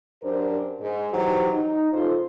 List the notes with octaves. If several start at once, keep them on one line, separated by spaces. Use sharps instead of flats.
F#2 D4 G4 A#4 C5
G#2
E3 F#3 D#4 F#4 G4 C5
D#4
C#3 F4 A4 C5